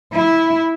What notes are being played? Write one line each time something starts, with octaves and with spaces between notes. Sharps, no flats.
E4